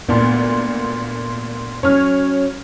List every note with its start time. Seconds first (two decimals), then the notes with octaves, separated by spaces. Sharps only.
0.09 D2 A#2 B3 D4
1.83 F#3 C#4 C#5 F6